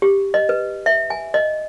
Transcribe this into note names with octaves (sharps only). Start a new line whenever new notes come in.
G4
D#5
B4
E5
G#5
D#5